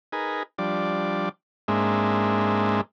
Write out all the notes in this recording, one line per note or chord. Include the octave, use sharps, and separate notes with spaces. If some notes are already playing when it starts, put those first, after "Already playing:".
D#4 G#4 A#4 B4
F3 G3 D4 D5
G#2 G#3 A#3 C4 D4 E5